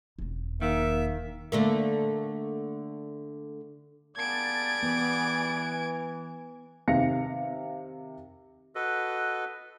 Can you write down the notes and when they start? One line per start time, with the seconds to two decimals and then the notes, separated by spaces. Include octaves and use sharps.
0.19 E1 C4
0.61 D#3 A#3 E5
1.52 D3 A3 A#3
4.17 G3 A#3 B3 G#4 D5 A5 G#6 D7
4.83 E3 B3
6.88 C3 D#3 F5 A#6 C#7
8.75 F#4 A4 B4 D#5